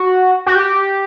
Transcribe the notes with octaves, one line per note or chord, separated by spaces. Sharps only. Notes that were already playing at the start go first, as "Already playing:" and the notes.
Already playing: F#4
F#4
G4